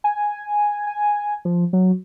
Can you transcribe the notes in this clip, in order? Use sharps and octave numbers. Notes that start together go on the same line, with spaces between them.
G#5
G#5
F3
F#3